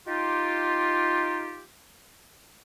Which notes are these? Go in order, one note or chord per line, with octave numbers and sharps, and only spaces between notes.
D#4 F4 G4